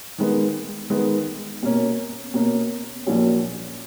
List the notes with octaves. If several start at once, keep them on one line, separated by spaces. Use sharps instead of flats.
D#3 G#3 B3
D#3 G#3 B3
B2 A#3 C#4
B2 A#3 C#4
A#1 A#2 F#3 C#4